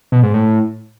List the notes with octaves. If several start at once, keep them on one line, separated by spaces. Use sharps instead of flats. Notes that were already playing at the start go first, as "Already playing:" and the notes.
B2
G#2
A2